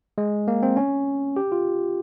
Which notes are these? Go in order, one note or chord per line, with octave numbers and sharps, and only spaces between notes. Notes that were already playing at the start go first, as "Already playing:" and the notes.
G#3
A#3
C4
C#4
G4
F4